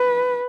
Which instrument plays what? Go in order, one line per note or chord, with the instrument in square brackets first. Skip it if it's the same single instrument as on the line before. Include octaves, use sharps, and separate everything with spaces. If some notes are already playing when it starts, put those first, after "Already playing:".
Already playing: [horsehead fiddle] B4